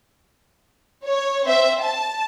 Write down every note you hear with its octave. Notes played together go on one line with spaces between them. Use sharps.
C#5
C4 C5 E5
A5